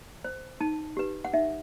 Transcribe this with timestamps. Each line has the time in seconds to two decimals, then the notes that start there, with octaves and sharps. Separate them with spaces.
0.24 C5
0.61 D#4 A5
0.97 G4 B4
1.25 F#5
1.33 D#4 E5